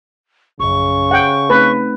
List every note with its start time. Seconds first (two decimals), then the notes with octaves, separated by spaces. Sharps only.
0.60 A#1 F#2 C#3 C#6
1.11 F#5 G5
1.50 A3 C4 D#4 B4